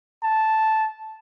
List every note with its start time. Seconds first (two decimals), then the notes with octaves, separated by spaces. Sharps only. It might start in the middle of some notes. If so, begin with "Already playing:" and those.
0.23 A5